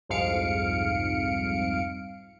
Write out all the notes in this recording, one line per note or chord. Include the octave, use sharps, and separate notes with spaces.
C2 F2 G#2 F5 C#7 D7